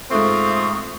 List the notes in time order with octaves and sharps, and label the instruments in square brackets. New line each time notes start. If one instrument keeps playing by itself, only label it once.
[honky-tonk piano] G#2 A3 [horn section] C4 F4 [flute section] E5 C#6 D#6